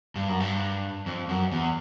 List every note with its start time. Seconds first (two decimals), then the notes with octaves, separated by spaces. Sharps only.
0.15 G2
0.28 F#2
0.40 G2
1.06 F2
1.29 F#2
1.52 E2